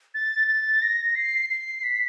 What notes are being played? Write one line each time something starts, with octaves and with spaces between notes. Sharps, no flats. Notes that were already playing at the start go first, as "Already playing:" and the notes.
A6
A6
A#6
C7
C7
B6